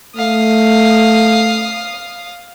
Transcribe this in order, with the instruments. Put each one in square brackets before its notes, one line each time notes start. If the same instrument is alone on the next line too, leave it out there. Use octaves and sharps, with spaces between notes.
[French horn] A3 [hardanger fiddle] F5 D#6